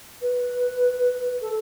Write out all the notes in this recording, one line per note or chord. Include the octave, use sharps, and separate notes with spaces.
B4
A4